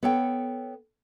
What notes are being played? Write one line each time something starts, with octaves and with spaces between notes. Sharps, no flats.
B3 A4 C#5 G5